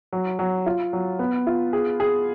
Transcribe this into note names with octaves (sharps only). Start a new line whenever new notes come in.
F#3
F#3
F4
F#3
B3
F4
G#4
G#4